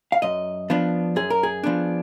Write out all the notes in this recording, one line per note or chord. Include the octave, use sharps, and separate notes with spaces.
F5
F#2 D#5
F3 B3 D4
F#2 G#4
A#4
G#4
F3 B3 D4